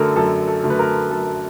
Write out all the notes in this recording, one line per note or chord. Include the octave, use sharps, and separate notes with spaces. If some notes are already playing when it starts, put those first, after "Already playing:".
Already playing: F#2 D3 F#3 A3 A4 A#4
F#2 A4
A4
D3 F#3 A3
B4
A#4
F#2 A4